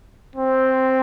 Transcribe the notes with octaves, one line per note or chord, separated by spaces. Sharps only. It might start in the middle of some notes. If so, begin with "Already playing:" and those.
C4